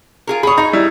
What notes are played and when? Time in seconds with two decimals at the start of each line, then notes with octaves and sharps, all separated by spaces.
0.27 F4 G#4 A#4
0.43 G#4 C#5 B5 D#6
0.58 D#4 G#4 A#5
0.73 G3 E4